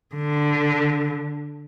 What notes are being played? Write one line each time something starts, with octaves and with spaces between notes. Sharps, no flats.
D3